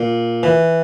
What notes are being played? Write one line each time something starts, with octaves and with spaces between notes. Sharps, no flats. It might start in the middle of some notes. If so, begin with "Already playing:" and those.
Already playing: A#2
E3